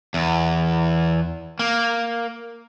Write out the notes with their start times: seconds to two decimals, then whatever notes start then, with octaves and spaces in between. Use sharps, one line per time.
0.14 E2
1.59 A#3